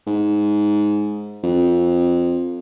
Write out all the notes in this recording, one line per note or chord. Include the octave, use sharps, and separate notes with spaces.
G#2
F2